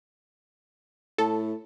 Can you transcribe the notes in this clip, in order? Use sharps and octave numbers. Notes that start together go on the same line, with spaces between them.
A2 A4